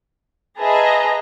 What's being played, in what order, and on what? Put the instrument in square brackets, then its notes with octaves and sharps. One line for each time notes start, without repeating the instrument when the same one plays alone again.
[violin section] G#4 B4 D#5 E5 A5 A#5